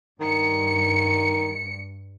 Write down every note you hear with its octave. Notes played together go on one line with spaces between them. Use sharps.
G2 D#3 C#7